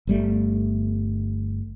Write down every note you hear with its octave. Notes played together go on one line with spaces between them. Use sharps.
G1 G3 A3